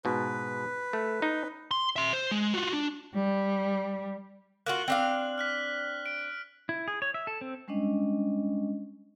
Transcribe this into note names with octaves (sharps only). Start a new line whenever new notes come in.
G#2 B2 B4
A3
D#4
C6
E5 C6
C5
G#3
F4 F#4
D4
G3
A#3 F4 F#4 F#6 F#7 G7
C4 D4 F5
F6 F#6 B6
D7
E4
G#4
C#5
E5
A4
C4
G3 G#3 C#4 D4 D#5